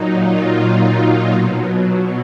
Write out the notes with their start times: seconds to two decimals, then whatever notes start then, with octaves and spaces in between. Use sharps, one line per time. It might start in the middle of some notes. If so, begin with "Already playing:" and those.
Already playing: A#2 F#3 D#4
0.18 F4
1.31 B2 F#3